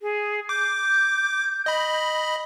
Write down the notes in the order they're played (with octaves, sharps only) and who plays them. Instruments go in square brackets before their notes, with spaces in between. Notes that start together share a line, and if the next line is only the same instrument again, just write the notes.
[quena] G#4
[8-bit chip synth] D6 [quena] G6
[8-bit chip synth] D#5 B5